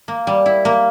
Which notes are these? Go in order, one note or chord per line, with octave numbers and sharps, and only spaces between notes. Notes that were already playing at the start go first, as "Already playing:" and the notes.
A#3
G3
E4
A#3